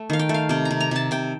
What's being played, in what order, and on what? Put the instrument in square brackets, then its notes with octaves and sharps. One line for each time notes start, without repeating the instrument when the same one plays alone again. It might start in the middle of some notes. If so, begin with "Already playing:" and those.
Already playing: [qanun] A3
D#3 F5
G5
A3
F5
C3 G5
A#5
C3
A#5
C3 A5
C3 G5